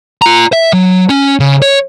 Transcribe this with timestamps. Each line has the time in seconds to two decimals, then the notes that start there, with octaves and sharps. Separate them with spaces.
0.22 F4 A#5
0.53 E5
0.73 F#3
1.09 C#4
1.40 C#3
1.62 C#5